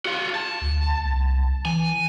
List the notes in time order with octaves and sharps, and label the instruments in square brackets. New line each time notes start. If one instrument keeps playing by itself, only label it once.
[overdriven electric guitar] F#4 F5
A5
[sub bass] D2
C2
[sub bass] E3 [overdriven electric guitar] G#5